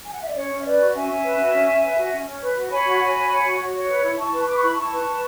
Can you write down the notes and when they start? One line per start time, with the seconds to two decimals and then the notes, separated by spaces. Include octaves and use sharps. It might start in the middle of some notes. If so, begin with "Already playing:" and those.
0.05 G#5
0.13 F#5
0.20 E5
0.27 D5
0.35 C#4 C#5
0.50 C#4
0.60 E5
0.64 B4 D5
0.79 F#4
0.94 C#4 E5 G#5
1.09 C#4
1.24 B4
1.38 F#4
1.53 C#4
1.68 C#4
1.83 B4
1.97 F#4
2.12 C#4
2.26 C#4
2.41 B4
2.56 F#4
2.70 C#5 G#5 B5
2.86 F#4
3.00 F#4
3.15 C#5
3.29 C#5
3.44 F#4
3.59 F#4
3.74 C#5
3.89 B4
4.03 E4
4.18 E4 A5 C#6
4.33 B4
4.47 B4 D6
4.55 C#6
4.62 E4 B5
4.72 E4 A5 C#6
4.91 B4
5.06 B4